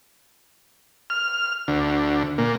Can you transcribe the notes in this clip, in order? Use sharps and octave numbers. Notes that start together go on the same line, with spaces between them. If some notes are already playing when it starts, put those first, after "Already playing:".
F6
D2
A#2